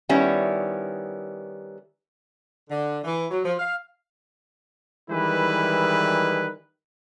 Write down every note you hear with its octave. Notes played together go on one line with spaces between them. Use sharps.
D#3 G3 B3 C#4 E4
D3
E3
F#3
F3
F5
D#3 E3 G3 G#3 E4 B4